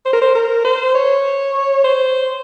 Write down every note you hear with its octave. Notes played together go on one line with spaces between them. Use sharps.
C5
A#4
C5
A#4
C5
C#5
C5